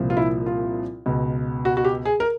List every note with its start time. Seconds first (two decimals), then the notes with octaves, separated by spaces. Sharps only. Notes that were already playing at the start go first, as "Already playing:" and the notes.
Already playing: C2 A#2 F3
0.10 F4
0.17 E4
0.46 F4
1.06 C#2 B2
1.65 F#4
1.77 F#4
1.85 G4
2.05 G#4
2.20 A#4